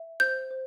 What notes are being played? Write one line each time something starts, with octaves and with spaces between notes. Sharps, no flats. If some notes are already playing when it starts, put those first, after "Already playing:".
Already playing: E5
C5 G6
C5